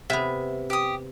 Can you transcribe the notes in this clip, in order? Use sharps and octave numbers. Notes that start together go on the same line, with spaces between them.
C3 B3 E5
G4 D#6